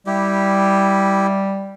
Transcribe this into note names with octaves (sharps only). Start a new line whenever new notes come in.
G3 E4 G4